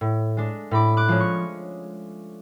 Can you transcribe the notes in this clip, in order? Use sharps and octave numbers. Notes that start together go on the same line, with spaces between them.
A2
G#3 D4
A2 B5 D6
D6 F#6
F3 G#3 C#4
C#6